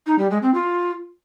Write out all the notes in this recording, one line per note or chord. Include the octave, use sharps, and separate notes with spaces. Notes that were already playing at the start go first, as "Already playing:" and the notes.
D#4
G3
G#3
C4
F4